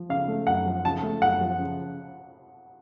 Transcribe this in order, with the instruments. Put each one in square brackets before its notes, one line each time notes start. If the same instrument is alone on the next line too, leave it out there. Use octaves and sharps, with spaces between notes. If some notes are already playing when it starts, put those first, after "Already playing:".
Already playing: [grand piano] F3
[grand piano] C#3 [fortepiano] F5
[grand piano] A3
[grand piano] F#2 [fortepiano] F#5
[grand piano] F3
[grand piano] C#3 [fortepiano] A5
[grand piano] A3
[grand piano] F#2 [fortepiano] F#5
[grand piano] F3
C#3